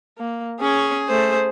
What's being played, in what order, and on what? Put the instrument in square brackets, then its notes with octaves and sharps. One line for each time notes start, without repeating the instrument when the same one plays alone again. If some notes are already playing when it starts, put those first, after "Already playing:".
[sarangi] A#3
[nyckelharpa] C#4 C#5 [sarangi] G#4
[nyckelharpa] A3 C5